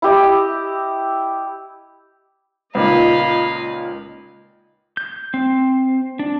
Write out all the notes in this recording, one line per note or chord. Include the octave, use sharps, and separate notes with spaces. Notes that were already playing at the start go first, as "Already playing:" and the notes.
E4 G4 D#5
C#2 A#2 D#4 D#5 F5 B5
G6
C4
D4